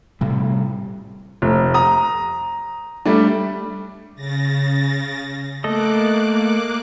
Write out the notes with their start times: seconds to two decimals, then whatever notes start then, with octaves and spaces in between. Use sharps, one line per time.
0.21 A2 C3 G3
1.42 F1 A3
1.74 A#5 D#6
3.05 G3 A3 D4
4.15 C#3 A6 A#6
5.64 A3 A#3 A4 D#5 D6 F#6